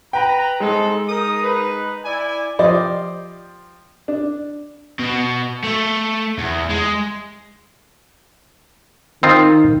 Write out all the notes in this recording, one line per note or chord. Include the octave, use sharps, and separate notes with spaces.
B4 G5 A#5
G#3 C4 D#4 A4
D#4 A#4 D#6
D#4 B4
E4 D5 G#5
F3 G4 C5 D5 D#5
D4
B2
A3
E2
G#3
D#3 C4 D#4 F4